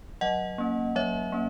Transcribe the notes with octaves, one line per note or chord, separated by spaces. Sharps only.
F#3 D#5 F#5
A#3 C#4
F#3 C#5 E5
A#3 C#4